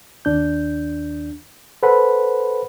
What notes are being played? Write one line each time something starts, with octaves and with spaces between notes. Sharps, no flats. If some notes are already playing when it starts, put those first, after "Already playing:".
D#2 D4 G6
A4 B4 C5 F#5 B5